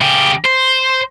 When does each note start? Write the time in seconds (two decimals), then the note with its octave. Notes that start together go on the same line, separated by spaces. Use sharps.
0.01 C#3 G4
0.45 C5